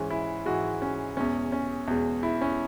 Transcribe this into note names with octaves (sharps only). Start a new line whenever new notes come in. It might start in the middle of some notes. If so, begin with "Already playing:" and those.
Already playing: G#2 E3 G#3 C#4
E4
G#2 E3 G#3 F#4
C#4
E2 B2 G#3 C#4
C#4
E2 B2 G#3
E4
C#4